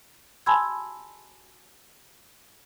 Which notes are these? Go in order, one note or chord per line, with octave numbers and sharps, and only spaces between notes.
G#5 A5 B5 C6 E6 G#6